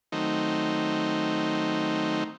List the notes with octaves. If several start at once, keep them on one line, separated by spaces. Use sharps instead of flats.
D#3 F#3 A3 C4 D#4